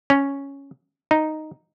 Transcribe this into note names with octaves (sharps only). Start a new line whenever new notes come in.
C#4
D#4